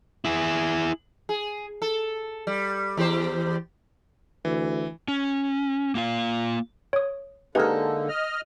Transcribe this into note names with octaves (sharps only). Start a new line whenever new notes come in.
E4 G#4
G#4
A4
G3
E2 G4 C5
D2 E3
C#4
A#3 F4 F5
C#5 D#6
D3 G#3 A#3 D#4 G4 A4 B4
D#5 F6